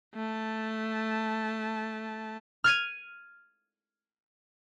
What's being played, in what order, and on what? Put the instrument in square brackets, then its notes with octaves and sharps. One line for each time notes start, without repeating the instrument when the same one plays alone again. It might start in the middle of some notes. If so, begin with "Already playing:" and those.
[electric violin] A3 A5
[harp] F6 G#6 D#7